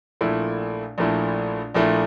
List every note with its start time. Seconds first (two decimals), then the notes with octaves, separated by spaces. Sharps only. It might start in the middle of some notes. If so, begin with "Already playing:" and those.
0.21 A#1 A#2 A3 E4
0.98 A#1 A#2 A3 E4
1.74 A#1 A#2 A3 E4